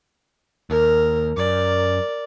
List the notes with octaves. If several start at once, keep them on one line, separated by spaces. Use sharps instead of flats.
D#2 A#4
F#2 A#4 D5